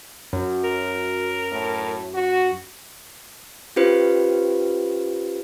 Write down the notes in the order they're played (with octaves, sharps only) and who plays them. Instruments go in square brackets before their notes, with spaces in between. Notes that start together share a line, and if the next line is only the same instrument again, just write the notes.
[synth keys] F#2
[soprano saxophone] A#4
[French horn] A2
F#4
[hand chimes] C#4 F4 G4 B4 C5